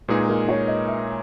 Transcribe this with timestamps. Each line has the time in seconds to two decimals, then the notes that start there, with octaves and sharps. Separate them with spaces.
0.08 A#2 G#3 D#4 G#4 B4
0.29 A#4
0.49 C#5
0.68 D#5
0.88 E5